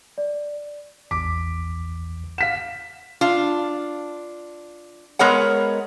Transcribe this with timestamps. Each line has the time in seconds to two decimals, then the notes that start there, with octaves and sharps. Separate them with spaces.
0.18 D5
1.11 A1 E2 D6 B6
2.38 F5 F#5 B6 E7
3.21 D4 F4
5.19 G#3 B3 A#4 C#5 F#5